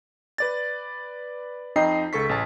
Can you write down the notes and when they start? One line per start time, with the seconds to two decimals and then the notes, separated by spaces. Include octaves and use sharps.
0.38 B4 D5 A6
1.76 F2 D#4 D#5 G5 C7
2.13 C#2 A4 C#6 B6
2.29 A1 A5